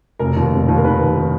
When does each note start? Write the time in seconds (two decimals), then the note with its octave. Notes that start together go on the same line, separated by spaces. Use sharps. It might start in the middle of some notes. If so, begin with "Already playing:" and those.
0.19 F1 A#4
0.37 D#2
0.52 F1
0.68 D#2
0.77 A#4
0.84 D#3 B4
1.00 D#2
1.16 D#3